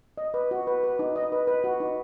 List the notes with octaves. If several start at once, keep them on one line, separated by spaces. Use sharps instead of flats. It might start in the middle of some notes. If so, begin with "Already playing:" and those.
D#5
B4
F#4
B4
B4
D#4
D#5
B4
B4
F#4
D#4